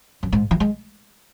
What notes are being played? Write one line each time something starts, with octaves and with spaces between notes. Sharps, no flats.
F#2
G#2
E3
G#3